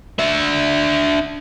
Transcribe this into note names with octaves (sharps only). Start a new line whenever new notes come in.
D4 E5